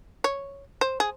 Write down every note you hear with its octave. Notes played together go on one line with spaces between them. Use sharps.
C#5
C5
G#4